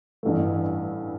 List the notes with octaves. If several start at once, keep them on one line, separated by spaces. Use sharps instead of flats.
A1 G2 E3 A3